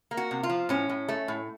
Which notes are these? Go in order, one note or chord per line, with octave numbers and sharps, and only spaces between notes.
A#3
F#4
C3
F4
F3
A2 C#4
A2
A3
A2